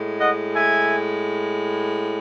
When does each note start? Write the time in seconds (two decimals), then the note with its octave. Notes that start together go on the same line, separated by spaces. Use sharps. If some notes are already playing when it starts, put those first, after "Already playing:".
Already playing: A2 G#3
0.19 D#5 F#5
0.55 E5 G#5